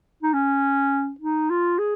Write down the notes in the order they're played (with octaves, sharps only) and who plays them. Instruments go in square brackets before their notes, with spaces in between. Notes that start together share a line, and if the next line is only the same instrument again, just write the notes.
[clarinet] D#4
C#4
D#4
F4
G#4